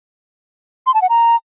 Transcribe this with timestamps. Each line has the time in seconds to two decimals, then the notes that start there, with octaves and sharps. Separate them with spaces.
0.87 C6
0.94 A5
1.02 F#5
1.09 A#5